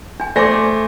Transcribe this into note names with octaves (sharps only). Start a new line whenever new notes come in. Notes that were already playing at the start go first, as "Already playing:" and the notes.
D4 G#5
A3 C5 D5 G#5 D6 A#6